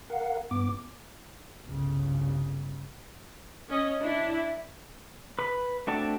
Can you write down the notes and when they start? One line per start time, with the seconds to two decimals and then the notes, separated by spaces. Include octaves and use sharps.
0.10 A#4 F5 F#5
0.51 G2 B3 D6
1.65 G1 C2 C#3
3.69 C#4 D#5
4.01 D4 E4
5.39 B4 B5
5.87 A3 C4 D4 F#4 A5